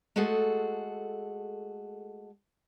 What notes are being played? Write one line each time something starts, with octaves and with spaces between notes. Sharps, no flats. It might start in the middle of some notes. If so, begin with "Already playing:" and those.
G#3 A3 F#4 G#4 A4